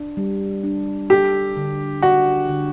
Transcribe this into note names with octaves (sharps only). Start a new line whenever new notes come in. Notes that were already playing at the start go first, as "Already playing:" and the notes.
Already playing: D4
G3
D4
G4 A4
D3
D4 F#4
D3